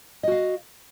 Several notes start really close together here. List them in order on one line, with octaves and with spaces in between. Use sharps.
D#5 F#4 F5